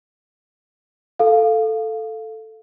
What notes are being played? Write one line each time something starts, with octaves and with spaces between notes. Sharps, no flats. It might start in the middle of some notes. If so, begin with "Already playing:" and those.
A4 F5